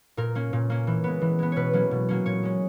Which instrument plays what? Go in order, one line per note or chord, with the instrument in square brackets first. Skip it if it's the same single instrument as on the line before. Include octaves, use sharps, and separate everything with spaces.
[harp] A#2 A#4
A#3 C#4
A#2
A#3 C#4
E3
G#3 B3
E3
G#3 B3
B2 B4 C#5
F#3 A#3 C#4
B2
F#3 A#3 C#4
A#2 C#5
G#3 C#4